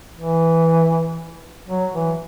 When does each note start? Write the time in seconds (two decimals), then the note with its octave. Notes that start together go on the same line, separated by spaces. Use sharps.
0.17 E3
1.68 F#3
1.93 E3